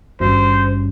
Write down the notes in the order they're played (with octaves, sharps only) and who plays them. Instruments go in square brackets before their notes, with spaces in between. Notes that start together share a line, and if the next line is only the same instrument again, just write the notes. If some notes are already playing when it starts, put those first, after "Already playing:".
[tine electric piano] G#1 G2 G3 C#4 [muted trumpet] C5